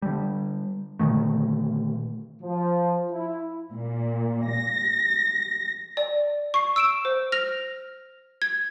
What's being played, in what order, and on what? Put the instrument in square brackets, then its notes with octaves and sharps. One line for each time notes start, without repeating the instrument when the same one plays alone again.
[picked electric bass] D3 G3
A#2 D3 D#3 A3
[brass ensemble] F3
E4
[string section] A#2
A#6
[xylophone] D5
C#6 C7
E6 D7 E7
C5
F6 A#6 F7
G#6